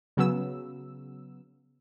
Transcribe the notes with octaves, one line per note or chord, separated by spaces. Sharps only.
C#3 F#3 B3 E6